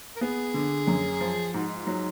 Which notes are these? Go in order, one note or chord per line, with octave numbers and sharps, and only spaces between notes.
A#4
B3 G#4
D3
F#2
F3
G#2 F#4
D#4
F4
F#3